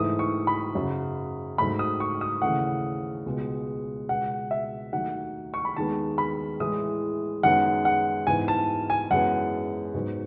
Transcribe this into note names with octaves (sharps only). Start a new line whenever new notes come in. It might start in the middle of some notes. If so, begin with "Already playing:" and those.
Already playing: G#2 E3 A3 D#6
C#6
B5
F#2 C#3 F#3
G#2 F#3 A3 B5
D#6
C#6
D#6
D#2 C#3 E3 A3 F#5
C#2 B2 G#3
C#2 B2 G#3 B3 F#5
E5
D#2 D#3 F#3 A3 F#5
C#6
B5
D#2 D#3 G#3 B3 A5
B5
A2 E3 G#3 D#6
F#2 D#3 G#3 B3 F#5
F#5
G#2 E3 B3 G#5
A5
G#5
F#2 E3 G#3 B3 F#5
G#2 F#3 B3